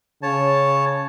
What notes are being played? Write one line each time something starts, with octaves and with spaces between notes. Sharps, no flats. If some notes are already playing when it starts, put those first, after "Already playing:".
C#3 C#5 A5